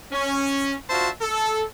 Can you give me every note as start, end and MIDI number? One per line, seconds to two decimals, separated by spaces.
0.12 0.73 61
0.90 1.09 62
0.90 1.09 65
0.90 1.09 66
0.90 1.09 72
0.90 1.09 76
0.90 1.09 81
1.21 1.63 69